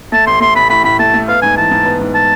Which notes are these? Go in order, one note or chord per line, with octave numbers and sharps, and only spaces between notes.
A3 A5
A1 C6
A3 C6
A1 B5
A2 B5
A2 B5
A3 A5
A3
B3 F5
G#2 G#5
E3 A5
G#2
B3
G#2
A5